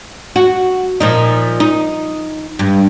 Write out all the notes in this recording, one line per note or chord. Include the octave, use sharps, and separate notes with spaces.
F#4
A#2 F3 D#4
D#4
G2